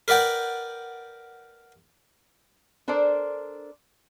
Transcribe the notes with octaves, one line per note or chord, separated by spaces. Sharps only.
A#4 B4 D5 F#5 G5
D4 A4 A#4 C5 D5